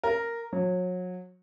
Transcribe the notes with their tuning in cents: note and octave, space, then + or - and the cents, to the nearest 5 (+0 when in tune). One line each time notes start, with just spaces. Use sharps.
A#4 -5
F#3 -30